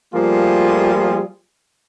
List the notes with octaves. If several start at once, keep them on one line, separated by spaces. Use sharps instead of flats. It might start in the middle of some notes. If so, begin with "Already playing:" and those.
F3 G3 A3 A#3 F4 G#4